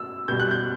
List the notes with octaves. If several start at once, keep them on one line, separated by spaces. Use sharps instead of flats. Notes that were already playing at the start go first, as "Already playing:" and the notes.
Already playing: B2 E6
B2 G3 G6
F#6
G6